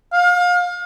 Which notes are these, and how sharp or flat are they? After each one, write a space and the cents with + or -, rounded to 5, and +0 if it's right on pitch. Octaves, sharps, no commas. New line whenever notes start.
F5 +30